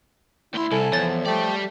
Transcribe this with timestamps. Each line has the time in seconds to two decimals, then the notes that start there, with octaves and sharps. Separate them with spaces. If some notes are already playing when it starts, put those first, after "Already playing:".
0.54 D2 E4 C6
0.72 C2 A4 G#5 A5
0.92 E2 F3 C#5 A6
1.26 G3 A3 D5 G5